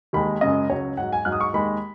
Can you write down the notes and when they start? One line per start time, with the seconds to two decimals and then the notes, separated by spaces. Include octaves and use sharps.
0.13 D#2 D#3 G#3 B5
0.41 F#2 C#3 G#3 D#5
0.70 C#2 C#3 F#3 C#5
0.97 G#2 F#3 F#5
1.12 G#5
1.25 G#2 F#3 F#6
1.32 D#6
1.41 C#6
1.53 D#2 D#3 G#3 B5